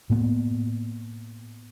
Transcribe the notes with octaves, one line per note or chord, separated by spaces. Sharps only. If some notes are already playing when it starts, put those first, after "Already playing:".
A2 A#3 B3